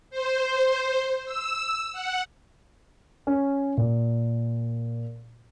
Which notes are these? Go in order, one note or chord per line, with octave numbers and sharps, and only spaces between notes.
C5
E6
F#5
C#4
A#2